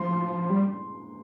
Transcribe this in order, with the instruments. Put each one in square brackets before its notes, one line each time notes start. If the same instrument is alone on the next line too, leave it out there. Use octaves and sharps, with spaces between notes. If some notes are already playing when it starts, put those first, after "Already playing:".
Already playing: [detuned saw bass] F3 [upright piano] C6
[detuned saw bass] G3